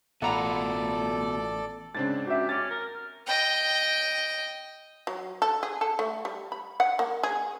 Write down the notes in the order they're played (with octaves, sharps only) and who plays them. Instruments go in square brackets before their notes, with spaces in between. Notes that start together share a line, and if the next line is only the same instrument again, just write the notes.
[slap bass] A1 [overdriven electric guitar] B2 F4 [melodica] A4 D5 [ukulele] F#5 A#5 B5
[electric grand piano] G#2 C4 D4 [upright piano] C#3 A6
[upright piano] F#4 E5 [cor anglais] G4
[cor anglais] C#4 [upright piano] D6 A6
[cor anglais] A#4
[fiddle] D#5 G5
[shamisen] F#3
A4
G#4
A4
A3
G3
B5
F#5
A#3
G#4